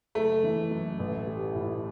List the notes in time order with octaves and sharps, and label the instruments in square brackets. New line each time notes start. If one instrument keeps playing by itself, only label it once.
[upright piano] F#1 [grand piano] A3
[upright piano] E3
F#2
A1
G3
A2